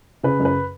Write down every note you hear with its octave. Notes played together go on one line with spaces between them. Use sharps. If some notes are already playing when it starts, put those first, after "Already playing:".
C#3 B4
F#2
B4